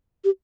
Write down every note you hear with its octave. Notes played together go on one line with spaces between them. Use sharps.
G4